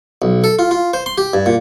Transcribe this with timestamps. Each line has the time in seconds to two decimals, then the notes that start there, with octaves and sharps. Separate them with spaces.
0.22 B1
0.44 A4
0.59 F4
0.71 F4
0.94 C5
1.06 C6
1.18 G4
1.34 G2
1.46 A#2